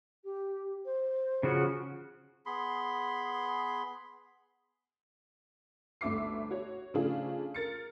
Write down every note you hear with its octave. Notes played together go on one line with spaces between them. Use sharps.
G4
C5
C#3 F3 F#4
B3 G#4 B5 C6
G1 D2 A3 E5 D6 C7
F#4 C#5
C#3 F3 A3 D4 F4 G#4
A#4 A6 C#7